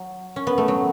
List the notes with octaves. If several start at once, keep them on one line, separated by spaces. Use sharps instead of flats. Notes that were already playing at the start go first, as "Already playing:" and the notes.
Already playing: F#3
C#4
B3
A3
F#3